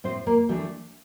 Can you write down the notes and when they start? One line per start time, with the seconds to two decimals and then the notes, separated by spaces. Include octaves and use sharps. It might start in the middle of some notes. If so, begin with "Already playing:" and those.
0.04 A2 C4 C5
0.26 A#3 A#4
0.49 E3 G3 A3 D4 G4